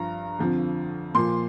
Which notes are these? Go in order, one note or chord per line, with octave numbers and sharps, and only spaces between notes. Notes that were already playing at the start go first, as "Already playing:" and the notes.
Already playing: G2 F3 A#5
F2 D3 F3
A#2 F3 C6